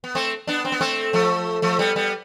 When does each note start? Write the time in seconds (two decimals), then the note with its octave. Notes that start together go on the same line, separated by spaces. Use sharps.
0.04 B3
0.15 A3 C4
0.47 B3 D4
0.65 C4
0.72 B3
0.81 A3 C4
1.13 F3 A3
1.62 F3 A3
1.79 G3 B3
1.96 G3 B3